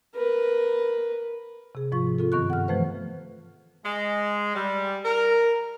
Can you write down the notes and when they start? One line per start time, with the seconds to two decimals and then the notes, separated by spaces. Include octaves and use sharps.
0.15 A#4 B4
1.75 C3 G#4
1.92 G#2 F3 F4 C#6
2.19 C4 F4 A4
2.32 G2 D#3 B3 C#6 F#6
2.50 F#5 F6
2.68 E3 F3 A3 B4 C5
3.85 G#3
4.55 G3
5.05 A#4